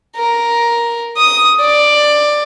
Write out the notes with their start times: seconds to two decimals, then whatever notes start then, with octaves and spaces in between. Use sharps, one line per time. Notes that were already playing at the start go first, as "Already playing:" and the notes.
0.16 A#4
1.17 D#6
1.61 D5